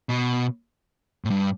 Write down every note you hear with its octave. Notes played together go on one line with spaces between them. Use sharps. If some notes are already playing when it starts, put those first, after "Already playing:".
B2
A2
G2